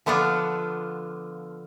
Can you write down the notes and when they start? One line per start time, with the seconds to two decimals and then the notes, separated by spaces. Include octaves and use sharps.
0.06 D3 F3 B3 D4 F4